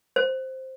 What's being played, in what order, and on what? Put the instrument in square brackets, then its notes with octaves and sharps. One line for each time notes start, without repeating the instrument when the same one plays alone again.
[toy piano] C5